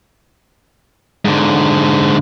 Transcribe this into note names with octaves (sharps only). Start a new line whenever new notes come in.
G#2 D3